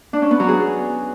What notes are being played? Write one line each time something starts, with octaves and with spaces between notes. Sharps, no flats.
D4
C#4
B3
F#3
G#4